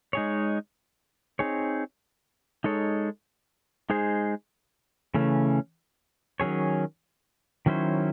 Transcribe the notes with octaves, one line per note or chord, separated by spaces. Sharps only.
G#3 D#4 G#4 C#5
C4 D#4 G#4 C#5
G#3 D#4 A4 C#5
G#3 D#4 G#4 C5
C#3 E3 A3 C#4
D#3 F#3 C#4 G#4 C#5
D#3 F#3 C#4 E4 C5